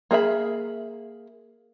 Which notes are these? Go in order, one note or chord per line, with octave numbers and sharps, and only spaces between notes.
A#3 G#4 E5 B5